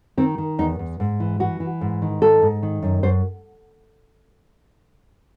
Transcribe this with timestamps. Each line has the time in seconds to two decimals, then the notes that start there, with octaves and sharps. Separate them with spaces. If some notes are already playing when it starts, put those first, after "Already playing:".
0.17 D#3 C4
0.38 D#3
0.59 E2 D#4
0.79 E2
1.00 G#2
1.20 E3
1.40 E3 F#4
1.60 E3
1.81 G#2
2.02 D#3
2.22 G#2 A4
2.42 G#2
2.63 D#3
2.82 F#2
3.03 F#2 C5